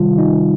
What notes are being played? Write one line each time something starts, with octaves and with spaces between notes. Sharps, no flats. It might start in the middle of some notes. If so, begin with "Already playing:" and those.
Already playing: C3 D#3 G3 F4
D#4